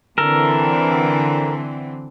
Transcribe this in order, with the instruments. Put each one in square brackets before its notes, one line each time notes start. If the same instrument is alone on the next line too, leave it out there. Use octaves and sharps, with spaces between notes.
[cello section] D3 E3 C4 [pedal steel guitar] A4 A#4